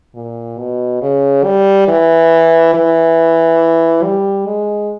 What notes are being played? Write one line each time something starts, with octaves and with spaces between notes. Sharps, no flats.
A#2
B2
C#3
G3
E3
E3
G3
G#3